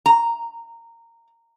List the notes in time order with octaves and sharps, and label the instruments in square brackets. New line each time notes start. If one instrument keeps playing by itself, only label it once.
[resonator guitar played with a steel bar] A#5